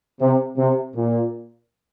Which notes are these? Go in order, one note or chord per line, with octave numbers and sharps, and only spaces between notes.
C3
C3
A#2